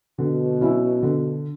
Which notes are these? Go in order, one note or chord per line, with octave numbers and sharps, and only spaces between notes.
B2 D3
F#3 C#4 E4
D3